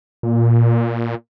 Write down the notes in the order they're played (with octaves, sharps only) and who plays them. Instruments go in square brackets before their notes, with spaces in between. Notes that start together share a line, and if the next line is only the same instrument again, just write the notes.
[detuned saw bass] A#2